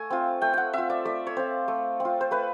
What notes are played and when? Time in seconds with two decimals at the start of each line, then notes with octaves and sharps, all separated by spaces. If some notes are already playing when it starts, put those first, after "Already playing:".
Already playing: A3 G#5
0.10 C4 F4
0.42 A3 G5
0.53 F#5 G5
0.73 C4 F4 E5
0.90 D5
1.05 A3 D5
1.27 C#5
1.36 C4 F4 C5
1.68 A3
2.00 C4 F4
2.21 C5
2.31 A3 B4